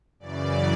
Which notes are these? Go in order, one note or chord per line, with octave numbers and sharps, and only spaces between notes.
F#2 C#3 E3 D5